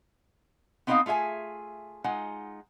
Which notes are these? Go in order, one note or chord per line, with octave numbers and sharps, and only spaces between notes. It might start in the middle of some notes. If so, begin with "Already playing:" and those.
B3 C4 D#4 C5 D#5 F5
A3 F4 G#4 E5 G#5
G#3 D#4 F4 F#5